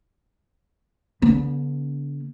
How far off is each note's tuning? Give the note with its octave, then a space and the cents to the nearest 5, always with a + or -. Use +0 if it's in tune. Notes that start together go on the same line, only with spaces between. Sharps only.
D3 -45 B3 -25